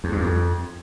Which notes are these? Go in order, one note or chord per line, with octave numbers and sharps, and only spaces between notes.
E2
G2
F2